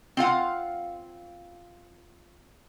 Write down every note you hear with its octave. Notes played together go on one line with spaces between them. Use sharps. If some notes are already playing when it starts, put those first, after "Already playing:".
C4 F4 F5 F#5